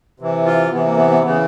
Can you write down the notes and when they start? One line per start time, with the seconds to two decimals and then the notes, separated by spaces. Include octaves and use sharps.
0.20 C3 E3
0.46 F4
0.71 C3 E3 B3
0.85 A#3
0.97 B3
1.10 B3
1.23 C#3 E3 B3